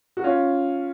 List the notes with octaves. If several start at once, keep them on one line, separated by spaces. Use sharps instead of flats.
F#4
C#4 F4